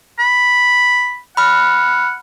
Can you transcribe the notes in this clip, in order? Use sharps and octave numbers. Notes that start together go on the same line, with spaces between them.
B5
F#5 B5 F6